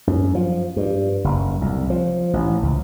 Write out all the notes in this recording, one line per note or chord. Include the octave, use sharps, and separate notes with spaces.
F#2
F3
G2
F#1
C2
F3
A1
C#2